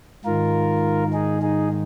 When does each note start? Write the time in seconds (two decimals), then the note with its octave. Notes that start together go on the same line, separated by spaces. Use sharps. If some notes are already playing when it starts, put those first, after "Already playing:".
0.25 G#2 D#3 F4 A#4
1.13 D#4 G#4
1.42 D#4 G#4